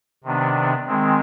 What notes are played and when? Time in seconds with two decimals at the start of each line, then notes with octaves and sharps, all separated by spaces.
0.24 C3 D#3 B3 D4
0.87 D#3 G#3 C4